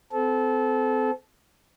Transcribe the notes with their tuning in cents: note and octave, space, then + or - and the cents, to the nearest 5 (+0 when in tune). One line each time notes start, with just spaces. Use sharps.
C4 -30 A4 -25